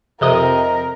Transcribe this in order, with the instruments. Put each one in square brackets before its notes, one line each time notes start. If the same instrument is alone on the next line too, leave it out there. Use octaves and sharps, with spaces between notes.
[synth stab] F2 C3 D#5 [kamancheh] A#4